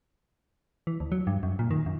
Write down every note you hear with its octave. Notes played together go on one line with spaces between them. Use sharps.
E3
D2
F#3
G2
F#2
A#2
D#3
F#2